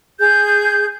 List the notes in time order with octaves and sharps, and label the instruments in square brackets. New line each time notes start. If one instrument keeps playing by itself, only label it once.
[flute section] G#4 G6